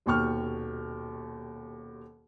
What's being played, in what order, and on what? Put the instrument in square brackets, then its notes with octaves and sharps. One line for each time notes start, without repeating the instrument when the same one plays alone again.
[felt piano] D#1 D#2 B2 G5 C#6 F6